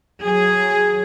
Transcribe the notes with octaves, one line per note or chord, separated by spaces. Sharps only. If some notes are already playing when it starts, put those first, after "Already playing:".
F#3 G#4